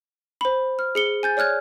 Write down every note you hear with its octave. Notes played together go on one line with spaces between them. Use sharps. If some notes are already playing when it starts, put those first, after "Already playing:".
C5 B5
F6
G#4 C#7 G7
G#5 G6 A6
C#5 D5 F6 F#6 G#6